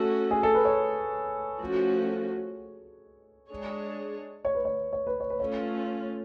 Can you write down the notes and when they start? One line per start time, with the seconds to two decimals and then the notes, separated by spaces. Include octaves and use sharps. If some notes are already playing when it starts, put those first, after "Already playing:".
Already playing: A3 C#4 F#4 A4
0.31 G#4
0.43 A4
0.54 B4
0.65 C#5
1.61 F3 A3 C#4 F#4
3.50 G#3 D4 G#4 C#5
4.45 C#5
4.55 B4
4.65 C#5
4.93 C#5
5.07 B4
5.20 C#5
5.30 B4
5.39 A3 C#4 F4 C#5